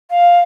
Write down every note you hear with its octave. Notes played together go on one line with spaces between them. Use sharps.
F5